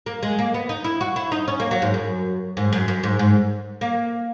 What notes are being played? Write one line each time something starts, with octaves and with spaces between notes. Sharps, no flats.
A#3
G#3
A#3
B3
D#4
E4
F#4
E4
D#4
C#4
A#3
F#3
G#2
F#2
G#2
F#2
F#2
G#2
G#2
A#3